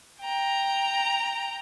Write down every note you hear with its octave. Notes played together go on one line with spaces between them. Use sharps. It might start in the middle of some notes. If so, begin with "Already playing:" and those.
G5 A#5